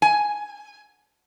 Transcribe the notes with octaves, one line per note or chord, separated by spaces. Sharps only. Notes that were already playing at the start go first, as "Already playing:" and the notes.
G#5